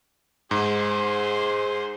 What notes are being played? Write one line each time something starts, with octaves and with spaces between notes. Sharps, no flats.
G#2 G#4 C5